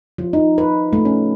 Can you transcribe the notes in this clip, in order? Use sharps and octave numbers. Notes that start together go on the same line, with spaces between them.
F3
D#4
B4
A3
C#4